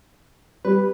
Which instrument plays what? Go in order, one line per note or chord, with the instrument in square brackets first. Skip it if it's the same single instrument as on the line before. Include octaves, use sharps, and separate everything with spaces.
[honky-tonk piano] G3 [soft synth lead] B4